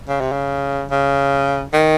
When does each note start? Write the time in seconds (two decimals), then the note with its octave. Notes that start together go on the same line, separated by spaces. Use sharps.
0.09 C#3
0.20 C3
0.32 C#3
0.91 C#3
1.73 D#3